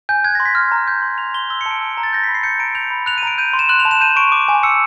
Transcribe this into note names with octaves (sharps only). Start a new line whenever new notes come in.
G#5 G6
F#6 G#6
A#6
C6
B6
F6
A#5
G6
C6
G6 F7
C6 G7
E6 G7
C#7
A5
D7
E6
A#5
A6
G6 A#6
B5 B6
C7
G6 C#7
A#5 D7
G6 F7
B5
F#6 F7
D#7
A#5 D7
G6 D#7
C6
E7
F#6 F#7
F7
A5
E7
G6 D#7
C#6 D7
D6
G#5
E6 C#7